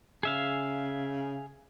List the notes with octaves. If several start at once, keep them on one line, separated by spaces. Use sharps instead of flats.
C#3 G#4 E5 F5